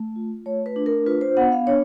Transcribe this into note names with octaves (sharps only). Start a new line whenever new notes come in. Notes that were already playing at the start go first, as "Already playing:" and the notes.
Already playing: A3
F4
A3 C#5
B4
D4
A#4
F4 B4
C5
B3 F#5
F5
D4 C#5